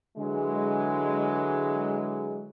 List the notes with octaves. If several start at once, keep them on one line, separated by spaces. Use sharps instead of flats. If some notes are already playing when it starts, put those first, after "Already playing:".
D3 E3 F#3 G#3